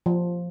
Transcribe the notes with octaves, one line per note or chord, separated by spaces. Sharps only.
F3